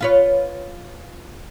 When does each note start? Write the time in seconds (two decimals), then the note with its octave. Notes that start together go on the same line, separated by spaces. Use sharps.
0.01 F4 B4 C#5